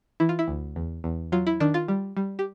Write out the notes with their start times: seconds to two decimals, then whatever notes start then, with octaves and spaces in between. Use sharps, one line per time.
0.20 E3 E4
0.29 F4
0.39 E4
0.48 D2
0.76 E2
1.04 E2
1.32 F#3 F4
1.47 E4
1.60 D#3 D4
1.74 F4
1.88 G3
2.17 G3
2.39 G4